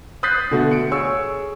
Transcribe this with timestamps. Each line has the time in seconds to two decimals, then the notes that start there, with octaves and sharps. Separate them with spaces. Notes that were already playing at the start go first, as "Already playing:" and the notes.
0.23 D#6 F#6 G6 A6 B6 C7
0.51 B2 D3 A3 F#4 A4
0.71 C#7 D7
0.91 G#4 C#5 C#6 E6